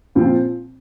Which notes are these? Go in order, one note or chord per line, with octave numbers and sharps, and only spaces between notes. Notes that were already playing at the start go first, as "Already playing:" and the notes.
A#2 F3 C4 F4